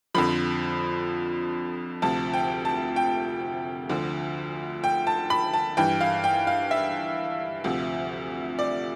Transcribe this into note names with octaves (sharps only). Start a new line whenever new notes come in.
F2 D3 F3 B5
D2 C3 F3 A5
G5
A5
G5
D2 D3 F3
G5
A5
B5
A5
G2 E3 G5
F5
G5
F5
E5
D2 C3 F3
D5